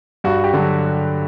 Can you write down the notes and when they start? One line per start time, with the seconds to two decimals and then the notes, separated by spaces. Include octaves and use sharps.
0.24 G2 F#4
0.44 G4
0.54 D3 F#3